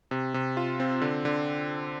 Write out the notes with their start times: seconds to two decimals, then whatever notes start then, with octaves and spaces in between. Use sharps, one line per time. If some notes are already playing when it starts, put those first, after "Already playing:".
0.11 C3
0.34 C3
0.57 F4
0.80 C4
1.01 D3
1.25 D3